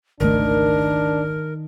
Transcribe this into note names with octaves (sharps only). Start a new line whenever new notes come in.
G#1 C#2 D#3 A3 D4 A#4